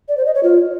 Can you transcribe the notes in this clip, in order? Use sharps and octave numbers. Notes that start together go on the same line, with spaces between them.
D5
C5
D#5
C#5
F4